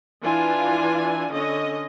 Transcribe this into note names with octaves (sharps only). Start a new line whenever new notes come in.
E3 D4 F4 G#5
D3 C#4 D#5